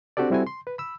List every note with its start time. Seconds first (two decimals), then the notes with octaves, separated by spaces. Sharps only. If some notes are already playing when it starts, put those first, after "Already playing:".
0.17 C4 D4 F#4 G4 A4 D5
0.30 G3 C4 E4 F#4 A4 G#5
0.47 C6
0.67 B4
0.78 B5 E6